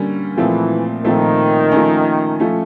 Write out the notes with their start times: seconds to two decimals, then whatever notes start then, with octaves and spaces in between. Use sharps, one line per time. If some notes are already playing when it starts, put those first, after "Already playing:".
Already playing: D3 G3 A#3 C#4
0.37 A#2 E3 F3 A3 C4
1.04 A#2 D#3 F3 A3 C4
1.72 F3 A3 C#4
2.40 F3 A3 C#4